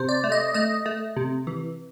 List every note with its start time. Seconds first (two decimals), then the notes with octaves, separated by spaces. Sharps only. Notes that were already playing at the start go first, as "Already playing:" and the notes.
Already playing: C3 C5
0.09 D5
0.24 A3
0.32 D#5
0.54 A3 D#5
0.86 A3
1.16 C3
1.47 E3